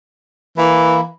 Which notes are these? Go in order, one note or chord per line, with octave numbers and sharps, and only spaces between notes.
E3 A#3 E4